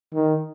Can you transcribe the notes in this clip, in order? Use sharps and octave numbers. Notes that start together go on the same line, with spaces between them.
D#3